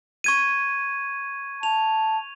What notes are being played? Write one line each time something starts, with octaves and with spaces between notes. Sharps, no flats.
C#6 G#6 D#7
A5 F7